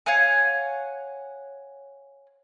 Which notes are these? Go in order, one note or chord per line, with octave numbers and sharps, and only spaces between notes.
C#5 F5 F#5 G#5